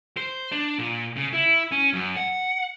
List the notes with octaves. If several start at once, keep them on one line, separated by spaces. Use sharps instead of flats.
C5
D4
A#2
C#3
E4
C#4
F#2
F#5